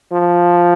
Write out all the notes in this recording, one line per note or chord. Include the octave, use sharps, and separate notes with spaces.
F3